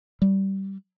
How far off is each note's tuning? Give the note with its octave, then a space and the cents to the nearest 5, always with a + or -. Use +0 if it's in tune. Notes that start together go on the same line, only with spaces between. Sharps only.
G3 -15